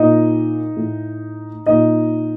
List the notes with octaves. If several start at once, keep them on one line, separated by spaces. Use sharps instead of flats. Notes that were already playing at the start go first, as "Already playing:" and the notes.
Already playing: A#2 D#4 D#5
A2
A#2 D#4 D#5